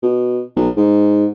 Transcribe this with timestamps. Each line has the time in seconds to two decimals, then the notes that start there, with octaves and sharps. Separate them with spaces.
0.03 B2
0.56 B1
0.76 G#2